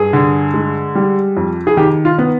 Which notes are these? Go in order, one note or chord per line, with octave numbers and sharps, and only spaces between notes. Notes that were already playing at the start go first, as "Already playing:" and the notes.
Already playing: G2 G#4
D3
G#3
G3
F2
G#4
D#3 G4
F4
B3